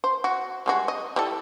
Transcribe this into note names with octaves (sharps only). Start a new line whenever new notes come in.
C5
F#4
G3 G#3 F#4
D#5
G3 E4 A4